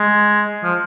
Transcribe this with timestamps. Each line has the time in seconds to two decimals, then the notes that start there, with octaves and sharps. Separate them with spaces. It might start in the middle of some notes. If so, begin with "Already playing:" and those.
Already playing: G#3
0.64 F3